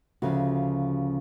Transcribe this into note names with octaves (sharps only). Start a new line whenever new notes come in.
D2 C#3 F3 F#4